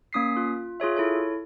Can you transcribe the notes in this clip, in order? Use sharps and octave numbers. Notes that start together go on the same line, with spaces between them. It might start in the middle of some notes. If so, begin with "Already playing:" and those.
A#3 C#4 D#6 B6 C7
F4
F4 G#4 C#5 E5
E4 A4 C#5